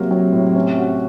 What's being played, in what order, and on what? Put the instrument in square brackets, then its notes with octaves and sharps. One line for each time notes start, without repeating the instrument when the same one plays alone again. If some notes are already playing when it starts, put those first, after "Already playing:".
Already playing: [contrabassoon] C3 [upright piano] F#3 A#3
[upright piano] F#3
A2
C#4
F#4